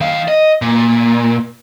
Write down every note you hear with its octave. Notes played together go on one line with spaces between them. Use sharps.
D#3 F5
D#5
A#2